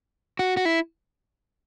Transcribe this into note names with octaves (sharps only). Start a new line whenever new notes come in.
F#4
F#4
E4